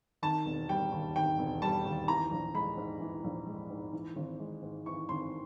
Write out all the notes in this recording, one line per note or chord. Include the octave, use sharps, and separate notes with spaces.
D#3 A5
E1
G3 G5
D#2
D#3 G5
E1
G3 A5
D#2
E3 A#5
A#1
G#3 B5
G#2
E3
A#1
G#3
G#2
E3
G#1
G#3
G#2
E3 C#6
G#1 C6